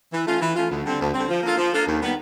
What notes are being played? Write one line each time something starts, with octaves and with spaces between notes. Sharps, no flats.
E3
A3 C#4 F4
E3
A3 C#4 F4
D2
D3 G3 C4
D2
D3 G3 C4
F3
A#3 D4 F4 A4
F3
A#3 D4 F4 A4
D#2
D#3 G3 B3